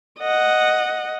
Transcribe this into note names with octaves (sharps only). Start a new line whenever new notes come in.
D#5 F#5